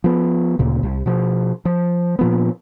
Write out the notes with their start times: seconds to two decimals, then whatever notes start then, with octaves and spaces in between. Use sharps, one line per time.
0.04 F3 B3
0.59 D2 A#2 C#3
0.83 C2
1.06 B2 F3
1.65 F3
2.19 A#2 F3 B3